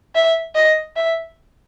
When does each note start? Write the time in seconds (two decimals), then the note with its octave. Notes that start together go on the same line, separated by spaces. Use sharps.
0.15 E5
0.55 D#5
0.96 E5